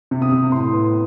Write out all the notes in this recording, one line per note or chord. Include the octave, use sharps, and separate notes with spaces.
C3
D#6
C3
A2 C6
B3